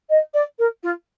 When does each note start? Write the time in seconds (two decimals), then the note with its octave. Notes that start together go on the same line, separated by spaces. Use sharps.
0.09 D#5
0.34 D5
0.58 A#4
0.83 F4